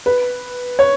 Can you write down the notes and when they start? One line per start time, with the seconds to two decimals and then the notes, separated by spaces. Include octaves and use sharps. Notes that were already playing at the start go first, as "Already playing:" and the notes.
0.06 B4
0.79 C#5